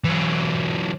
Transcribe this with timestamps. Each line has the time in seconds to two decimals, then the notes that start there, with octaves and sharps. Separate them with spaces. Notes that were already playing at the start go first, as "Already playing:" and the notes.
0.04 E3 F#3